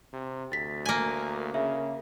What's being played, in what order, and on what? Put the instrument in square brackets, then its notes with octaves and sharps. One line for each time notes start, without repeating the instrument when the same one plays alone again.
[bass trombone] C3
[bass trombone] D2 [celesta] A6 B6
[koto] A#3 G#5
[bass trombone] C#3 [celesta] E5